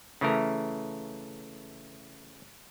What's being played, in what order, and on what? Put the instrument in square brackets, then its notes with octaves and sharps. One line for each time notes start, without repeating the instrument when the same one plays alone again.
[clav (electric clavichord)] C#3 E3 A3 A#4